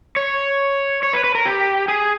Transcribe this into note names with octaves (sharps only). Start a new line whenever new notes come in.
C#5
C#5
B4
B4
A#4
G4
G#4